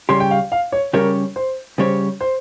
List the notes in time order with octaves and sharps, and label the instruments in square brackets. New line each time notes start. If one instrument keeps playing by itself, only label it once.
[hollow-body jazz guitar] C#3 G3 C#4 G4 C#5 [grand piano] C6
[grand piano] G5
F5
F5
C#5
[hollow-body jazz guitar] C#3 G3 C#4 G4 C#5 [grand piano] A#4
[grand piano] C5
[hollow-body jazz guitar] C#3 G3 C#4 G4 C#5 [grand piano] C5
[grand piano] C5